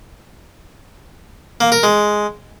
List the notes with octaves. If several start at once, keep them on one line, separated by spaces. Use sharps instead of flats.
A#3
A#4
G#3